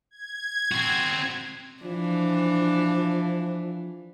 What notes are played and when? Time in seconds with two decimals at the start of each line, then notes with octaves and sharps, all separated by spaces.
0.11 G#6
0.72 C4 F#4
1.83 E3 F3 D4